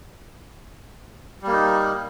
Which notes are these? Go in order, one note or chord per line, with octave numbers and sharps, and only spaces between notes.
G3 A#3 D#4